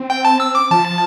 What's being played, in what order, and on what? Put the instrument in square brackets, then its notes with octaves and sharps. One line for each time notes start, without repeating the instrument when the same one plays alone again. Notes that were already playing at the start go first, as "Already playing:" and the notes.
Already playing: [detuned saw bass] C4
[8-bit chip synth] G5
A5
E6
D6
[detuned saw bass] F3 [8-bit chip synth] A5